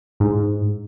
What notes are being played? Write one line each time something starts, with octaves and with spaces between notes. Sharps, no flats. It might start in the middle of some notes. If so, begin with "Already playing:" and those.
G#2